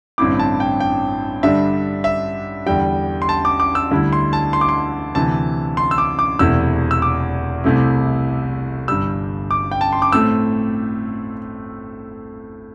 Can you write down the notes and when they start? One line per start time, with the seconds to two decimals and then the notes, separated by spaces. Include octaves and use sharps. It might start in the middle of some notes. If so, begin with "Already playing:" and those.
0.18 A1 G2 D3 C4 E4 D6
0.39 A5
0.60 G5
0.80 G5
1.43 G2 D3 G3 D4 E5
2.04 E5
2.66 E2 D3 G3 G5
3.22 C6
3.29 A5
3.45 D6
3.60 D6
3.75 E6
3.91 D2 D3 G3 E4
4.13 C6
4.33 A5
4.53 C6
4.61 D6
4.69 C6
5.15 D2 C3 E3 A5
5.77 C6
5.91 E6
5.98 D6
6.19 D6
6.39 E1 E2 C3 A3 E4 E6
6.91 E6
7.02 D6
7.64 C2 C3 A3 C4 E4
8.88 G1 G2 G3 E6
9.51 D6
9.72 G5
9.81 A5
9.93 C6
10.02 D6
10.12 A2 A3 C4 E6